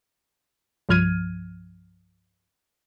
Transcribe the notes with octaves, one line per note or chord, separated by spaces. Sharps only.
C2 G2 F3 F6 G#6 D#7